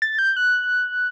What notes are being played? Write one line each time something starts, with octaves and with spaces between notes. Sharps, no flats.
A6
G6
F#6